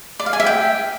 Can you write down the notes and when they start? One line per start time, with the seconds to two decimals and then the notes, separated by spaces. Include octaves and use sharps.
0.20 D5
0.26 F5
0.33 G#5
0.40 E5
0.46 G5